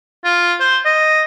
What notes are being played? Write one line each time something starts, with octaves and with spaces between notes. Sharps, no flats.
F4
C5
D#5